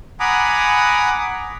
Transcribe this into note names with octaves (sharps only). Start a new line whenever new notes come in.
F#5 G#5 A#5 B5 D6 D#6